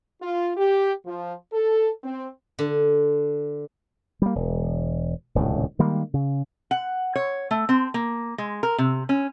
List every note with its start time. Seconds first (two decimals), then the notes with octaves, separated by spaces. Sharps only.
0.22 F4
0.57 G4
1.04 F3
1.52 A4
2.04 C4
2.59 D3
4.22 G3 A#3
4.35 E1
5.35 D#1 C#2 A2 C3
5.79 D#3 G3 G#3 A#3
6.14 C#3
6.71 F#5
7.16 C#5
7.51 A3
7.69 C4
7.94 A#3
8.38 G#3
8.63 A#4
8.78 C3
9.09 C#4